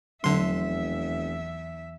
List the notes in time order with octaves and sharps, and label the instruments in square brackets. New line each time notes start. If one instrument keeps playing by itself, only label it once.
[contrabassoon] F1 [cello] E2 E5 [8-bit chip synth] D3 C6 [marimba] F#3